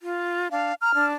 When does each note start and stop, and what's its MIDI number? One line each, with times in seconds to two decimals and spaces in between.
0.02 0.48 65
0.51 0.73 62
0.51 0.75 77
0.81 0.91 82
0.81 1.05 89
0.94 1.14 62